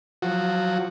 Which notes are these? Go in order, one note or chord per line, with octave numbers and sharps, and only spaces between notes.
F3 F#3 F#4